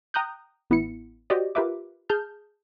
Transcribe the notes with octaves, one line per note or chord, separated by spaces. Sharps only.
G5 A#5 D#6 F#6 G6
A1 B3 E4 C#7
F#4 G4 C5 D5 D#5
F4 G4 A#4 B4 E5 D6
G#4 A5 F6 G6